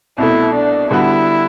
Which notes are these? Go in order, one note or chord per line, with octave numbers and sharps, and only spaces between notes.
C2 B2 A3 E4
D4
D3 G3 B3 E4 F#4